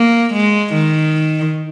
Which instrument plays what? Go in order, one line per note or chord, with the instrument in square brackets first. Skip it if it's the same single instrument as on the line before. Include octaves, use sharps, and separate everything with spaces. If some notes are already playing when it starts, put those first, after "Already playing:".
Already playing: [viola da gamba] A#3
G#3
D#3